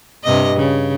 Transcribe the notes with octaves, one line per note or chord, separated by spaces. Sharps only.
G2 C3 D#5
C#3